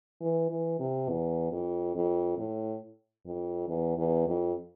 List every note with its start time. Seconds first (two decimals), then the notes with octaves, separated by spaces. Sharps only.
0.21 E3
0.50 E3
0.80 C3
1.09 E2
1.52 F2
1.96 F2
2.38 A2
3.26 F2
3.69 E2
3.98 E2
4.27 F2